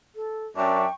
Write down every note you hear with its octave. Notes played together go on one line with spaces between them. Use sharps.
A4
F#2 D4 E5 G5 C#6